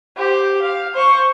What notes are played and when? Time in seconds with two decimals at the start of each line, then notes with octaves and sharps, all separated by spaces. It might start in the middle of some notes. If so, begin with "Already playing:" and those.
0.17 G4 C5
0.62 F5
0.94 C5 C#6